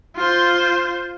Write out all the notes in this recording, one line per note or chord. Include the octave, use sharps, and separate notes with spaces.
F4 C5